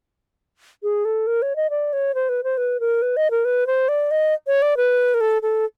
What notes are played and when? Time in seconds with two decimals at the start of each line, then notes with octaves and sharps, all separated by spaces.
0.83 G#4
1.05 A4
1.27 A#4
1.42 C#5
1.56 D#5
1.70 D5
1.93 C#5
2.15 C5
2.29 B4
2.44 C5
2.57 B4
2.80 A#4
3.02 B4
3.17 D#5
3.31 A#4
3.45 B4
3.67 C5
3.89 D5
4.11 D#5
4.47 C#5
4.62 D5
4.77 B4
5.14 A#4
5.21 A4
5.42 A4